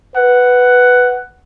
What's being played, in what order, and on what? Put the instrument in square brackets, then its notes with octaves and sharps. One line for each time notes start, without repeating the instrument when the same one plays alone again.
[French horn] B4 [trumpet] F#5